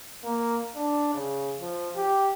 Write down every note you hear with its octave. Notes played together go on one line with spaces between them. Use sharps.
A#3
D4
C#3
F3
G4